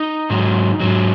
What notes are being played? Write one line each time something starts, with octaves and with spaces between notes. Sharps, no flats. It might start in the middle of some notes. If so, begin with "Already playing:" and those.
Already playing: D#4
G#2 F#3
G#2 F#3